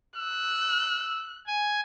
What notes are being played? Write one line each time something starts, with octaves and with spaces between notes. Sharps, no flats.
E6 F#6
G#5